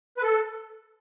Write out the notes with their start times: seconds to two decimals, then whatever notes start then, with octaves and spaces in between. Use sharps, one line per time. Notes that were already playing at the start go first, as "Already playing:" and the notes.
0.17 B4
0.23 A4